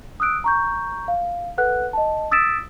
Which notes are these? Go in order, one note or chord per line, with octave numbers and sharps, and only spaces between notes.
D#6 E6 F#6 D7
A#5 C#6 G6
F5
A4 B4 F#5 F#6
D#5 A5
D#6 E6 A6 B6 D7 E7